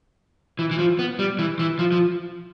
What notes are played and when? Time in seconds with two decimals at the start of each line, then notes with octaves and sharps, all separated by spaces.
0.59 E3
0.71 E3
0.79 F3
0.99 B3
1.19 G3
1.39 E3
1.59 E3
1.79 F3
1.92 F3